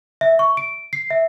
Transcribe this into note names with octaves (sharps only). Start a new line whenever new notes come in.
E5
C#6
D7
C7
E5